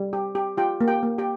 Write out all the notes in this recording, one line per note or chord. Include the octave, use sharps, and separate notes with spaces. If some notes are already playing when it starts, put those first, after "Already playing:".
Already playing: G3
G4
G4
F4 G4 G5
A#3
G4 G5
A#3
G4 G5